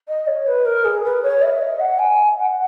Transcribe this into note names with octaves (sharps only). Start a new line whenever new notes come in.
D#5
C#5
B4
A#4
G#4
B4
C#5
E5
D#5
F#5
G#5
F#5